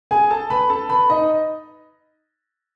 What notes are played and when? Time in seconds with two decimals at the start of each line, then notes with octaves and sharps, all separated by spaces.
0.11 G#4 G#5
0.30 A4 A5
0.50 B4 B5
0.69 A4 A5
0.89 B4 B5
1.10 D#4 D#5